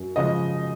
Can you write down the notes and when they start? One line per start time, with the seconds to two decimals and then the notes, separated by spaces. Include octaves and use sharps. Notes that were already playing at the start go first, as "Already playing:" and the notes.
Already playing: F#2
0.16 C#3 F3 G#3 D#5